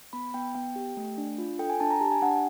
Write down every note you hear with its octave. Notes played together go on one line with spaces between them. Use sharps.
B3 B5
B3 G5
B3 G5
G4
A3
D4
F4
A4 G5
G#5
D4 A5
A#5
G4 A5
G#5
D4 F#5